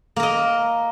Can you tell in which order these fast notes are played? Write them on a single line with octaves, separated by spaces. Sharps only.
A#3 A#4 D#5